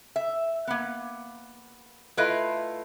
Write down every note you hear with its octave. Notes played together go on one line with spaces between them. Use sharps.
E5
A#3 B3
A3 E4 F4 B4 D#5